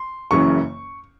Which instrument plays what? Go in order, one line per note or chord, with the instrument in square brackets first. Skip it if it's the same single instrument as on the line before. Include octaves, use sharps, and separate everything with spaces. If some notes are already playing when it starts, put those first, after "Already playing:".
Already playing: [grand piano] C6
F#1 F#2 C#3 E3 C#6